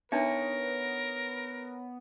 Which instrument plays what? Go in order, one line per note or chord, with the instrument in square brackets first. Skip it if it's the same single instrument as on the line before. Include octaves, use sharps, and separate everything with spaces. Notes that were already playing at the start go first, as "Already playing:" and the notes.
[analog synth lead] B3 [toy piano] D4 D#4 E5 [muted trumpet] A#4 [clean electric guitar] B4 C#5